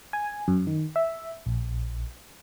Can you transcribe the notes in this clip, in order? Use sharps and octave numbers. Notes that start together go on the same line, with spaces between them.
G#5
F#2
D#3
E5
A#1